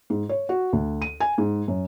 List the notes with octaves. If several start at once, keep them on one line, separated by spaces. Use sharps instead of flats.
G#2
C#5
F#4
D2
D#7
G#5
G#2
F#2